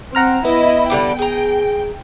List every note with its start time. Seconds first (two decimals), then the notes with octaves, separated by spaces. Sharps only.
0.15 C4 F#5 A#5 F6
0.45 B3 E4 D#5
0.90 D3 G3 D4 G5
1.19 G#4 A#5